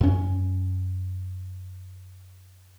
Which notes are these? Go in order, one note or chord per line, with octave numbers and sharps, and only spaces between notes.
F#2 C#4